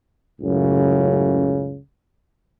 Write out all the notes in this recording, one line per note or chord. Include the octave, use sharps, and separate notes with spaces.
C#2 F#2 A2 C#3